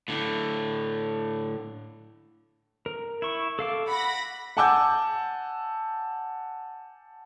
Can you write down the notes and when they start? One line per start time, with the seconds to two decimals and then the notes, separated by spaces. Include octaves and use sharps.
0.08 A2 D3
2.86 A#4
3.22 E4 C#6
3.59 A4 F5 D6
3.88 F#5 B5 A#6
4.57 F#5 G#5 A5 D6 E6 G6